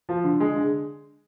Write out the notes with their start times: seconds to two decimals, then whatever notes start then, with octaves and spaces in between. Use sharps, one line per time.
0.09 F3
0.24 D3
0.40 G#3
0.56 D3